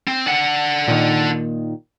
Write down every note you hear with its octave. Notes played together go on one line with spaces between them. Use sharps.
C4
D4 F#5
A#2 D#3